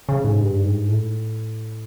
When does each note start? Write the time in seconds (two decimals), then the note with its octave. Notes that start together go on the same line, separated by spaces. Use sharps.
0.09 C#3
0.24 G#2
0.40 G2
0.64 G#2
0.88 A2